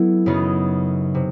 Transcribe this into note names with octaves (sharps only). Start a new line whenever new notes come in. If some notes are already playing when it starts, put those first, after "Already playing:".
Already playing: F#3 B3 E4 A4
F#2 C#3 F#3 B3 D#4
C3